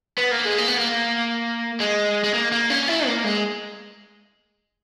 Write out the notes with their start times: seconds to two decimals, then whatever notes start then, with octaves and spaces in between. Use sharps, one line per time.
0.18 B3
0.31 A#3
0.45 G#3
0.58 A#3
0.68 B3
0.78 A#3
1.80 G#3
2.24 G#3
2.34 A#3
2.52 A#3
2.70 C#4
2.88 E4
3.07 A#3
3.24 G#3